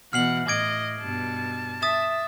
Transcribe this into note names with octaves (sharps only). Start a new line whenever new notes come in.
B2 E3 F#5 F6 C7 F#7
A2 D#5 D6 G#6 D7
G2 B2 A5
E5 D#6 A6 E7